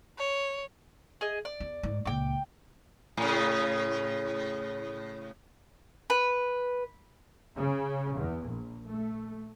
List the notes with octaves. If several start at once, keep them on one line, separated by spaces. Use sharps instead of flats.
C#5
G#4 D#5
D5
E2
G#2
C#2 A#2 G5 D6
A2 C#3
B4
C#3
E2
A#1
A3